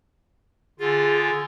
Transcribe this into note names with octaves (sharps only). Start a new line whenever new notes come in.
D3 F4 G#4